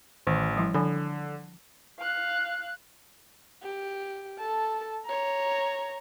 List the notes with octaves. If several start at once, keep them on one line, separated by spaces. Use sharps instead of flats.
A1 D#3
F3 G3 E4
D3 F3 G#5 B5
F5 F#6
G4
A4 A5
C#5 A#5